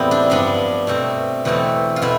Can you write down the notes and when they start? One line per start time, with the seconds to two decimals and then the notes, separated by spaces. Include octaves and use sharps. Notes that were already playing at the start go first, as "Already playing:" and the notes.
Already playing: E2 A2 G3 B3 C4 E4
0.11 D4
0.30 G2 F3 B3 D4
0.87 B2 A3 C4
1.45 E2 B2 A3 C4
1.96 F4
2.02 B2 A3 E4